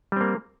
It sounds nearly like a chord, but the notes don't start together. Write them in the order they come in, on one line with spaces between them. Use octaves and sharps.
G3 C4 A#3